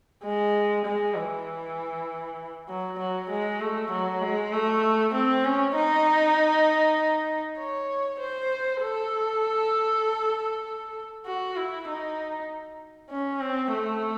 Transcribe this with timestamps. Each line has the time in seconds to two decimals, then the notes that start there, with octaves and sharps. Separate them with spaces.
0.23 G#3
0.85 G#3
1.15 E3
2.69 F#3
2.99 F#3
3.30 G#3
3.61 A3
3.91 F#3
4.21 G#3
4.53 A3
5.14 C4
5.45 C#4
5.75 D#4
7.59 C#5
8.20 C5
8.82 A4
11.26 F#4
11.56 E4
11.88 D#4
13.10 C#4
13.40 C4
13.72 A3